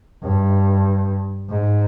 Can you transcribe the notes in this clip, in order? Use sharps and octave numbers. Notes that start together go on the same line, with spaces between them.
G2
G#2